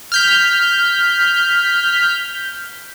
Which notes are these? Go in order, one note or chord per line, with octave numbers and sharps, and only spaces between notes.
F6 G6 B6